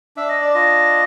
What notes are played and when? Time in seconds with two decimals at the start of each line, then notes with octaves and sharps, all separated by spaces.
0.16 D4 E5
0.29 D#5
0.42 D5
0.54 F4 D#5